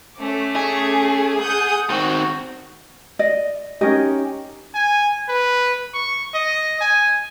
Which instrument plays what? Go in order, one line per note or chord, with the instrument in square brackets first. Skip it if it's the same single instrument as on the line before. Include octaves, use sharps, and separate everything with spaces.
[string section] A3 C#4 D6
[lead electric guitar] G#4
[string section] F#5 D#6 G6
[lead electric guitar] D#3 C4 [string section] F#4
[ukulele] D5 D#5
[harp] C#4 D#4 G4 [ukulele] A#4 D#5
[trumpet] G#5
B4
C#6
D#5
G#5